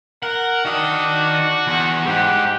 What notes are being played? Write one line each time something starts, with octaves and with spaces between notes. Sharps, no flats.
A#4 F#5
D#3 D4 F#4 D#5
E2
G#2 G4 F#5